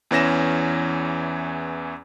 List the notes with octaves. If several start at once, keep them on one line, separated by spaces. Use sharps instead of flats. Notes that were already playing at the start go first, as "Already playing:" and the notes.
E2 E3 C#4 A#6 E7